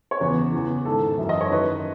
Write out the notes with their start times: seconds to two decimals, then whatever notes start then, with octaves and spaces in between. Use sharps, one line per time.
0.11 C#5
0.20 E2 C#3 E3 B4
0.53 E2 C#3 E3
0.86 G#2 D#3 A4
1.18 F#2 E3 E5
1.29 D#5
1.41 C#5
1.51 F#2 D#3 B4